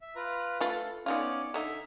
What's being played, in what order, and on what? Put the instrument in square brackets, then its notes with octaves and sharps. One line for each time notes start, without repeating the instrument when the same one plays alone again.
[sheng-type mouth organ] E5
F4 B4 A#5
[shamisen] A3 F4 B4 [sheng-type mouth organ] A4
[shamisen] B3 D#4 F4 [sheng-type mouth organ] C#4 D5
[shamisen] D3 D#4 [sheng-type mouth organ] E5